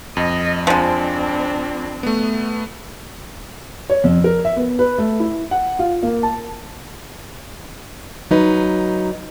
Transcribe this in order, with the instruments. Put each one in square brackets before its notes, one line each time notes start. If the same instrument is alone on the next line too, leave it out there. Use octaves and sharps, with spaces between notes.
[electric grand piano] F2 [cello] D#5
[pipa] F3 G#3 [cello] C4 D4
[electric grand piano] A3 B3
[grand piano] C#5
F2
A#4
E5
B3
B4
A3
E4
F#5
F4
A#3
A5
[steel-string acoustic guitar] F#3 D#4 B4